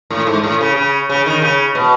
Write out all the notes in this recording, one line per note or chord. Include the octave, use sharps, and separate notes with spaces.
A2
G#2
A2
C#3
C#3
C#3
D#3
C#3
B2